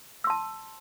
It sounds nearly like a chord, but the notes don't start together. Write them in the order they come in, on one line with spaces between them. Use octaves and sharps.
E6 C6 A5